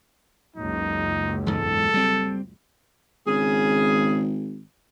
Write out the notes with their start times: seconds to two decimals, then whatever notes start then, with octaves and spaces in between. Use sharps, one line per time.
0.56 F#1 C#2 D#4
1.46 E2 G#2 A4
1.94 G3 C4
3.27 G#1 C#3 G#4